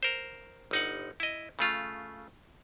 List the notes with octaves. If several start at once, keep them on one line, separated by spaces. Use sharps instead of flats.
A#4 C5
G1 D#4 F#5
E4 D#5
C#3 A3 F4